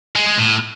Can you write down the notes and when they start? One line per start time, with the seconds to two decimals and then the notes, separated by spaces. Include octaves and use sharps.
0.15 G#3
0.27 G#3
0.38 A2